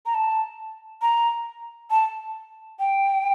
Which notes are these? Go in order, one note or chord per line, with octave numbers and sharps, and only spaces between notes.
A#5
A5
A#5
A5
G5